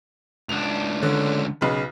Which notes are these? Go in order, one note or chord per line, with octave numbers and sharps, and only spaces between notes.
C#2 D4 F7
D3 C#4
B1 C#3 B4